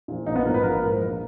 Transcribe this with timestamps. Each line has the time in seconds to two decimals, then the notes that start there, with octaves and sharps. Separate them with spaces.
0.08 A#2 F3
0.26 A#1 D#4
0.36 B3
0.45 G#2 F3 A#4
0.54 B4
0.63 A#1 A#4
0.82 G#2 F3
1.01 A#1